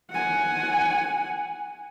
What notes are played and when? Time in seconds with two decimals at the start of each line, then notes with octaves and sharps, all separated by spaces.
0.11 F#5 G#5